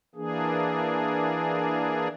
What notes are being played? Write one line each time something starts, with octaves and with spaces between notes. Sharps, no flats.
E3 A#3 D4 G#4